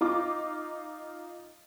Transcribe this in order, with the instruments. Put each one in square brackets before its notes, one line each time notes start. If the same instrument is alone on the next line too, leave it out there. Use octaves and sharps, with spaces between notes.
[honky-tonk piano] D#4 F4 D6